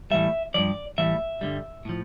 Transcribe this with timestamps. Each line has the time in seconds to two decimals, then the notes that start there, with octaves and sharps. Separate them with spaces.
0.11 A2 E3 G3 E5
0.54 G2 F3 D5
0.98 A2 E3 G3 E5
1.41 G2 D3 G3
1.85 A2 F3